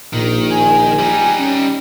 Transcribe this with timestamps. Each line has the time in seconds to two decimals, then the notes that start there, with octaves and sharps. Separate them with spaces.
0.13 A#1 A#2 D#3
0.51 G#5
0.99 G3 D#4
1.39 C#4